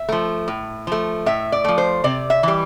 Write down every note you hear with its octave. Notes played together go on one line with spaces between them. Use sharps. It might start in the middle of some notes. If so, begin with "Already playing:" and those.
Already playing: E5
F3 A3
A2
F3 A3
A2 E5
D5
F3 A3
C5
C3 D5
E5
E3 G3